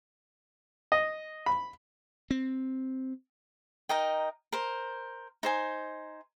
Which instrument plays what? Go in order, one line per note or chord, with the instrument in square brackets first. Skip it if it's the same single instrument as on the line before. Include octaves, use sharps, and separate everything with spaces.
[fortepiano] D#5
B5
[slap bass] C4
[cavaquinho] D#4 A#4 D#5 G5
A#4 C5
D#4 C5 G#5